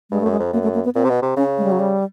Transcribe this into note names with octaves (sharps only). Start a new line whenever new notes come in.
G2 G#3
F#2 A3
G#3
F2
F#2 A#3
A3
A#3
B3
A#2 C4
C3
B2
C3
C#3 C#4
G#3
G3
F#3
G3